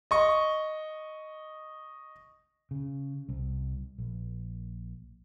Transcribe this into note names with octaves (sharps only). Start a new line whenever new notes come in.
D#5 C#6
C#3
C2
A#1